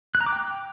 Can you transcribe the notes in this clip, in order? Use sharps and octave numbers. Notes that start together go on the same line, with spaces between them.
F#6
A#5
D6
G5